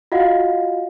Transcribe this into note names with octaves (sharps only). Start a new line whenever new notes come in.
F4 F#4 D#5 F5 F#5